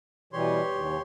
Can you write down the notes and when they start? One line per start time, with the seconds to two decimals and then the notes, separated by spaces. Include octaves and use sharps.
0.33 B2 E3 G3 G4 C#5 C6
0.74 D#2